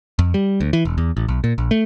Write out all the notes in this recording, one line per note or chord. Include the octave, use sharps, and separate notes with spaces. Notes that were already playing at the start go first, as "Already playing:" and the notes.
F2
G3
D2
E3
E1
E2
A1
B1
A#2
A#1
A3